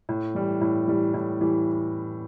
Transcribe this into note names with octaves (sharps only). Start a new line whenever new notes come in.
A2
E3 G3
A2
E3 G3
A2
E3 G3